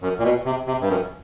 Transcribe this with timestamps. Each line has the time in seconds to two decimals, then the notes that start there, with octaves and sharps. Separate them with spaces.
0.02 F#2
0.19 A#2
0.24 B2
0.45 C3
0.66 C3
0.81 G2
0.89 F#2